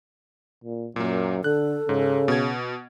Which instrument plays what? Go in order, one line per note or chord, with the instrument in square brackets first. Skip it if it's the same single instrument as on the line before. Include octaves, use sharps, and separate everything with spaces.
[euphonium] A#2
[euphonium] F#2 [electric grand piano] A#2 A#3
[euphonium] D3 [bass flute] A4 [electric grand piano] F#6
[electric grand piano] G#2 [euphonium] C#3
[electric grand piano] B2 G#6